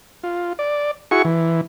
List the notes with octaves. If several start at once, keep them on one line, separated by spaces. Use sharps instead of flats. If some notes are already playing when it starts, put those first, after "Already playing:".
F4
D5
E4 F#4 G#4 C#6
E3